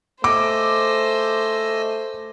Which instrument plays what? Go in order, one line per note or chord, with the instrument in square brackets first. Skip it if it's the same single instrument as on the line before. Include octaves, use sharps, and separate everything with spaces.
[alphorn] A3 [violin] C5 [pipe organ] D#5 G#5 E6 [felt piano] D6